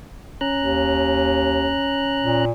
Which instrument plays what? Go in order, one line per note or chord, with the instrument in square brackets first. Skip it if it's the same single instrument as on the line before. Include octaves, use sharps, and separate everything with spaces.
[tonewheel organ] C#4 A#5 F#6
[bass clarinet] D#2
A#2